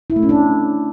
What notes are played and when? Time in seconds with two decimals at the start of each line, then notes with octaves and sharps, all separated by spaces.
0.10 E4
0.16 A3
0.23 C#4
0.29 D4